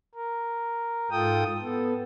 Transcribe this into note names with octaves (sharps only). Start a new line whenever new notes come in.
A#4
G#2 F4 A4 G5 D#6
B3 A4